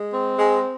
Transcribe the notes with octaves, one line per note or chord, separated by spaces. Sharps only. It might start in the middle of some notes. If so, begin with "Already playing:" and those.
Already playing: G#3
C4
G#3